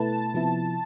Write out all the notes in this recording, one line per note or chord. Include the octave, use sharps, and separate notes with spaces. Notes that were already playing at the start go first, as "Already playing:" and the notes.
Already playing: B2 A3 E4 B4 A5
C3 F3 B3 E4